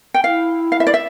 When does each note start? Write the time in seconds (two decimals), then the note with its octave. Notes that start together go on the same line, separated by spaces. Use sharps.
0.14 G5
0.24 E4 F5
0.72 F5
0.80 E5
0.87 D5
0.94 E5